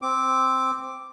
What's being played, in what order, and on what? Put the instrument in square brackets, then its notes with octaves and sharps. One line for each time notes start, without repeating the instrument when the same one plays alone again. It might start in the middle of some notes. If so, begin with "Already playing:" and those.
[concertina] C4 D6